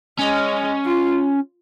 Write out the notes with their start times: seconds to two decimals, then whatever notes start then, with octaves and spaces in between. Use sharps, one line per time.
0.19 G#3 C#4
0.85 F4